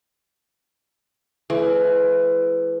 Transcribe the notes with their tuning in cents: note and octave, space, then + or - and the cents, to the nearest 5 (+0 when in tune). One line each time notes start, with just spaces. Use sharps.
E3 +25 A3 -45